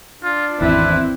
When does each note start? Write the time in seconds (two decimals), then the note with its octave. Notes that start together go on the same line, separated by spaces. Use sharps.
0.23 D4 F4
0.61 G#1 E2 C4 E4 B4